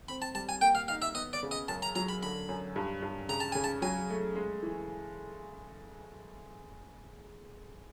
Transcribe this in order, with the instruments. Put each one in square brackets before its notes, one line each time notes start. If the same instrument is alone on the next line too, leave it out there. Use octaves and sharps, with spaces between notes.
[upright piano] C4 [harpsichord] B5
[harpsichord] A5
[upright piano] G3 [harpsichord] A5
[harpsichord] G#5
[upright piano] A#3 [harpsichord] G5
[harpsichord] F5
[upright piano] D#4 [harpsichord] F5
[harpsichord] E5
[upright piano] B3 [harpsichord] D#5
[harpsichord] D5
[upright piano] C#3
[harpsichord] D#5
[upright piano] F#2 [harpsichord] A5
[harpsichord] A#5
[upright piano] F#3 [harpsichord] A#5
[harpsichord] B5
[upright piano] D3 [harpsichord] B5
[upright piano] F#2
G2
G2
[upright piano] C#3 [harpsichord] A#5
[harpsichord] A5
[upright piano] C#3 [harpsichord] G#5
[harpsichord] A5
[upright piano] F#3 [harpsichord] G#5
[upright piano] A3
G#3
E3